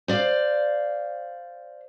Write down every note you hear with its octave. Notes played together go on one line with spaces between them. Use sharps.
C5 D5 F5